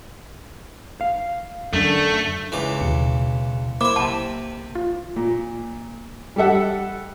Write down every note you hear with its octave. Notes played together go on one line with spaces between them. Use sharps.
F5
F#2 D3 A3
C#2 E3 D6
D#2 B2 C#7
A#3 E4 C5 E5 B5 C6 D6
B1 C3 A5
F4
A#2
G3 G4 A4 E5 F#5